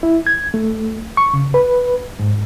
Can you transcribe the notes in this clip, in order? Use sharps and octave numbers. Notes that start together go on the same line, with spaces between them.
E4
G#6
A3
C#6
C#3
B4
G#2